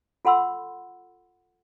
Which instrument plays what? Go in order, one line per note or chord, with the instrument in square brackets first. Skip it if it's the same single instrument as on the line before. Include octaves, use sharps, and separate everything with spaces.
[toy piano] F4 A4 F#5 B5 C6 E6